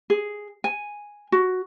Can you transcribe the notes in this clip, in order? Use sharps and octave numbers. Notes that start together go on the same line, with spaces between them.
G#4
G#5
F#4